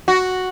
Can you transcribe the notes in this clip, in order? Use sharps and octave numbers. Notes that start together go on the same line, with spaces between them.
F#4